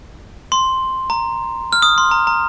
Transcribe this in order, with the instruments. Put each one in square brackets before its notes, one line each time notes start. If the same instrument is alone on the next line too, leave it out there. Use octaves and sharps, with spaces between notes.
[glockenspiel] C6
A#5
F6
D#6
C6
A#5
A#5